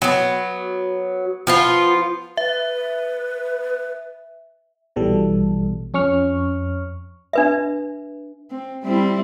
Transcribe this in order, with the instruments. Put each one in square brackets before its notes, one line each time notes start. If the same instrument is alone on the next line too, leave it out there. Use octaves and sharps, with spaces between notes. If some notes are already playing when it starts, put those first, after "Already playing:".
[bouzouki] F#3 B3
F3 B3 F4
[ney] B4 [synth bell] E5
[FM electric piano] A#1 B2 E3 G3 A4
F2 C#4 C#6 F6
[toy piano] D4 B4 E5
[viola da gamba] C4
G3 C4 E4